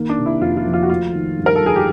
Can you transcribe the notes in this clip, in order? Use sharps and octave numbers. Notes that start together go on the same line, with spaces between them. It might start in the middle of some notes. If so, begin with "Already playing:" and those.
Already playing: D#3 A#3
D4
C3
E4
F2 F4
F4
F3
F4
F#4
A3 F4
D#3
G2
A#4
A4
F#3 G#4
G4